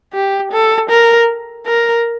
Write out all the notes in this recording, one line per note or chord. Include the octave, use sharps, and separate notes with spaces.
G4
A4
A#4
A#4